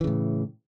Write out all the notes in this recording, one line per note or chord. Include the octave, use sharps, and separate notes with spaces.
A2 C#3 E3